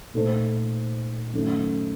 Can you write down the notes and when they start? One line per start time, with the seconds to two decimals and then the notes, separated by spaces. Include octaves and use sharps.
0.14 A#2 A3 D#4 A4 C5
1.33 F#2 D#3 A3